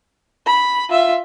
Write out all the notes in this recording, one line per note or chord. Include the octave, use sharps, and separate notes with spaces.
B5
F4 E5